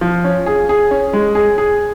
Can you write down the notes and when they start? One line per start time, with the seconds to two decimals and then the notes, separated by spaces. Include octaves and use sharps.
0.01 F3
0.24 C#4
0.46 G#4
0.69 G#4
0.91 C#4
1.13 G#3
1.35 G#4
1.58 G#4